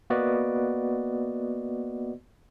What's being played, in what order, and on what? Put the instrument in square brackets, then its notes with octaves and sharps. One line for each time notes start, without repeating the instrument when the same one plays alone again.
[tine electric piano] A#3 B3 F#4 B4 D5 D#5